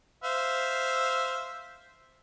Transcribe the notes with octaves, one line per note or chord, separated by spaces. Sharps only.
C5 E5 F5